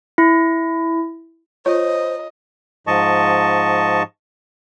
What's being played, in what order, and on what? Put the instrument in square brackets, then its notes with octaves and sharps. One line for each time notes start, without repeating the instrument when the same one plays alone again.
[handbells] E4
[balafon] F4 [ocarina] C5 [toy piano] C#5 [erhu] D#5
[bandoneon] G#2 F3 D#5 A5 C#6